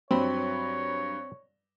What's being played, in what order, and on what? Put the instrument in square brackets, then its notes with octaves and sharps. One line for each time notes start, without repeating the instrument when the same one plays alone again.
[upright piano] G2 F#3 B5 [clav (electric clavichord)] C4 [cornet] C#5